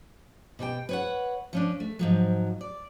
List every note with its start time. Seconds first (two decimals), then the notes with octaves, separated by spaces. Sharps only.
0.59 B2 G4 C#5 G5
0.89 B4 C#5 F#5
1.53 F3 C#4 D4
1.80 A3
1.99 G#2 F3 F#3
2.61 D5